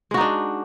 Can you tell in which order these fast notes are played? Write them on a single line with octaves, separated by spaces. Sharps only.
G#3 F#4 D#4 D4